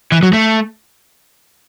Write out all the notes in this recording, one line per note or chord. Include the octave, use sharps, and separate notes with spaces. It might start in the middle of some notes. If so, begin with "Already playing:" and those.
E3
F#3
A3